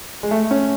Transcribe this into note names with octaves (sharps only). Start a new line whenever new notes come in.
G#3
A3
C#4